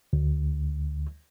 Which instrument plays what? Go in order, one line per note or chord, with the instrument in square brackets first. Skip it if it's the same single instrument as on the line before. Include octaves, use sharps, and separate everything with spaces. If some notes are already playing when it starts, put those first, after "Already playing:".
[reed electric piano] D2